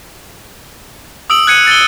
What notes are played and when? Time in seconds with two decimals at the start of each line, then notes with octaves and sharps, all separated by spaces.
1.30 D#6 E6 D7 F#7
1.47 F#6 G#6 C#7 D#7 F#7
1.67 A6 D#7 G7